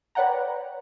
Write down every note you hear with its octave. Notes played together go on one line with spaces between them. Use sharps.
B4 C#5 D5 F#5 G5 A#5